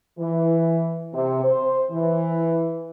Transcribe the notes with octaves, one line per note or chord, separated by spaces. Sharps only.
E3
C3
C5
E3